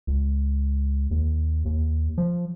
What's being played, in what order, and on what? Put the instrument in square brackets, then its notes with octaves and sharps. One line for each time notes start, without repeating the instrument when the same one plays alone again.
[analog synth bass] C#2
D#2
D#2
F3